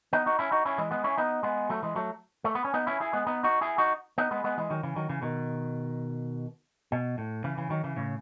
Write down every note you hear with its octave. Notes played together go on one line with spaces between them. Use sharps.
B3 D#4
D#4 F#4
C#4 E4
D#4 F#4
C#4 E4
E3 G#3
G#3 B3
C#4 E4
B3 D#4
G#3 B3
F#3 A3
E3 G#3
F#3 A3
A3
B3
C#4
B3 D#4
C#4 E4
E4 G#4
G#3 B3
B3 D#4
D#4 F#4
E4 G#4
D#4 F#4
B3 D#4
G#3 B3
G#3 B3
E3 G#3
D#3 F#3
C#3 E3
D#3 F#3
C#3 E3
B2 D#3
B2
A2
C#3 E3
C#3 E3
D#3 F#3
C#3 E3
A2 C#3